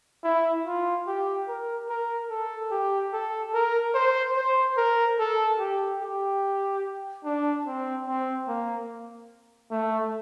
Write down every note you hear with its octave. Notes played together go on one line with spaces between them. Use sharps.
E4
F4
G4
A#4
A#4
A4
G4
A4
A#4
C5
C5
A#4
A4
G4
G4
D4
C4
C4
A#3
A3